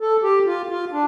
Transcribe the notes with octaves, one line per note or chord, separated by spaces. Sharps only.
A4
G4
F4
F4
D4